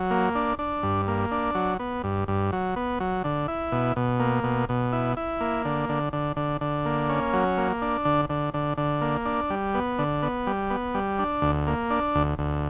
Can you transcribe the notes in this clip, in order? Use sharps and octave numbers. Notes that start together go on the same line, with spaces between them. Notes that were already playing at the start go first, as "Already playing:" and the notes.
Already playing: F#3
A#3
D4
D4
G2
A#3
D4
F#3
B3
G2
G2
F#3
B3
F#3
D3
E4
B2
B2
A#3
B2
B2
E4
E4
A#3
D3
D3
D3
D3
D3
A#3
C#4
F#3
A#3
D4
D3
D3
D3
D3
A#3
D4
G3
B3
D3
B3
G3
B3
G3
D4
D2
A#3
D4
D2
D2